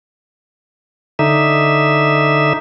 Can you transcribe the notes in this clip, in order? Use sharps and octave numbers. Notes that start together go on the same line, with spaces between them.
D3 D#4 E5